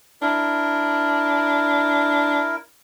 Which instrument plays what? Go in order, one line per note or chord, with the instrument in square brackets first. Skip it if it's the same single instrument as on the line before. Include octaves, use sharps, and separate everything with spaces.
[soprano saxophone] D4 [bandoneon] E4 A#4